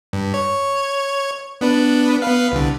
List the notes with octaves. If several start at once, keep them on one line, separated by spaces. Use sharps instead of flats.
G2
C#5
B3 D4 B4
B3 B4 F5
C2 D3